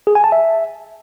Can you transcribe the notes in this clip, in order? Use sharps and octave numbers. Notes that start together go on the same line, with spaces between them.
G#4
G#5
A5
E5